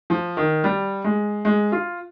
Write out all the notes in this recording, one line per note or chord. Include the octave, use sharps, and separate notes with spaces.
F3
D#3
G3
G#3
G#3
F4